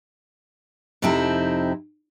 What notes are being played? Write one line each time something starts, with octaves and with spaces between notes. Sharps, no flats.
F2 C3 F3 C4 D#4 E4